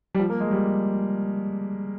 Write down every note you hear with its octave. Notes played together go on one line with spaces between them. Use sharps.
G3
F3
A#3
G#3
G3